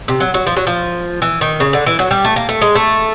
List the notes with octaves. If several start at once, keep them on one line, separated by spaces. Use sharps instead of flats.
C3
F#3
F#3
F3
F#3
F3
E3
D#3
C#3
D3
E3
F#3
G3
A3
A#3
A3
G#3
A3